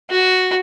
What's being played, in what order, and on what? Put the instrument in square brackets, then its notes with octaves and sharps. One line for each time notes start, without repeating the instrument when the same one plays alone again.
[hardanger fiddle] F#4